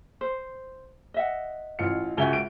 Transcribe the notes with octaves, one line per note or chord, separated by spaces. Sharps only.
C5
D#5 E5 F#5
A1 F4 C#7
C#2 F#4 E5 F#5 G#5 G7
D7